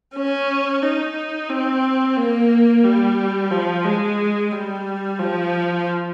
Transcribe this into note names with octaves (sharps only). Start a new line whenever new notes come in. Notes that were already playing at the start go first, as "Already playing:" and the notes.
C#4
D#4
C4
A#3
G3
F3
G#3
G3
F3